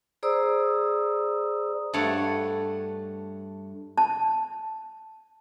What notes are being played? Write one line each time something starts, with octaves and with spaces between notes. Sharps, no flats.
G#4 C5 D5 A#5 D#6 E6
G2 A3 C#5 F#5
A5